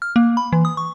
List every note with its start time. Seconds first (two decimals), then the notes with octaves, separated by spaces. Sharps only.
0.02 F6
0.16 A#3
0.37 B5
0.53 E3
0.65 D#6
0.77 C#6